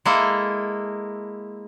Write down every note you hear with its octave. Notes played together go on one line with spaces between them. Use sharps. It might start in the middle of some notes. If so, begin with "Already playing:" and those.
G#3 A#3 E4 A4